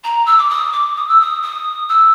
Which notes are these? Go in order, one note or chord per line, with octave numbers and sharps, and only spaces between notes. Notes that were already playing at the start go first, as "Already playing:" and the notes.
A#5
E6
D6
D#6
D6
D#6
E6
D#6
D#6
E6